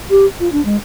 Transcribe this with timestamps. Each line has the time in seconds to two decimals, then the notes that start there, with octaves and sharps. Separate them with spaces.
0.10 G4
0.40 F4
0.52 D4
0.65 G#3